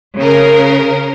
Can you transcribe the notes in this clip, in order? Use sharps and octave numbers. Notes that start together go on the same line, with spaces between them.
C#3 A#4